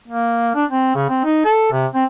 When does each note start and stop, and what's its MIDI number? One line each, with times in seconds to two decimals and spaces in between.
0.08 0.54 58
0.55 0.65 62
0.70 0.95 60
0.95 1.09 49
1.09 1.23 60
1.24 1.41 63
1.45 1.69 69
1.72 1.86 48
1.94 2.04 60